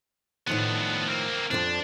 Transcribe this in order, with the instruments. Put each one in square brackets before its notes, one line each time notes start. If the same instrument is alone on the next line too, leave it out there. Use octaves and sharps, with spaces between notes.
[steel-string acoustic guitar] A2 D#3 F3 [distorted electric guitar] B3 D4
[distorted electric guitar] A#3 C4
[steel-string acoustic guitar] F2 D#3 F3 [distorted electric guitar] D4